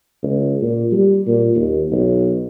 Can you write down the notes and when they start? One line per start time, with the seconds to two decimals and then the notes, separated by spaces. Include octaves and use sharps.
0.23 C#2
0.63 A#2
0.92 G3
1.27 A#2
1.56 D#2
1.92 B1